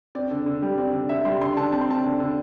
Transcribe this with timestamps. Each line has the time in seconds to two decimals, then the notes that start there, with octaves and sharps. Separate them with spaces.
0.15 C4 D5
0.31 D3
0.46 D3
0.62 G3
0.78 C4 D5
0.93 D3
1.09 D3 E5
1.25 G3 C6
1.41 D3 C6
1.56 D3 A5
1.72 C4 A5
1.81 C6
1.88 C4 A5
2.04 D3
2.20 D3